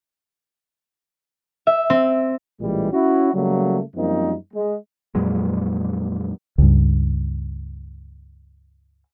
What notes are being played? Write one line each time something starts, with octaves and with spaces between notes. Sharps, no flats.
E5
C4
A1 A#2 E3 G3 G#3
C#4 E4 F#4
C#3 F#3 G3 A3 A#3
F#2 F3 G3 A#3 C4 D#4
G#3
F2 A#2 F#3 G#3
C#2 G2